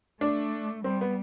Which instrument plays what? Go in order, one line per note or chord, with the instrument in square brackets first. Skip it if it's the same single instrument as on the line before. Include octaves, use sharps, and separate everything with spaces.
[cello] A3 [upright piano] D4
[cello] G3 [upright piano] C4
[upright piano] B3